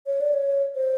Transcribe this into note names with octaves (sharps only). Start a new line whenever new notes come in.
C#5
D5
C#5
C5